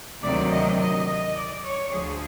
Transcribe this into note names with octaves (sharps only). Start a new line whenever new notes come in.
D2 C3 D#3 F#3 D5
D#5
D#5
D#5
D5
C#5
D2 D3 F3 G#4